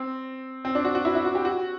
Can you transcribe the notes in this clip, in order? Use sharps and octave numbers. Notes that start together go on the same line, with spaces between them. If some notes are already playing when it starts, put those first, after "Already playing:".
Already playing: C4
C4
D4
F#4
F#4
E4
E4
F#4
G4
F#4